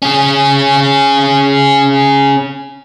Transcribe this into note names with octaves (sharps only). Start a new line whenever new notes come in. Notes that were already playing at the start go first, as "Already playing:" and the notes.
C#4 G#4